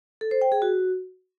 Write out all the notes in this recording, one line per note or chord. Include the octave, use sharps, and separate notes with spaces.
A4
C5
G5
G#4
F#4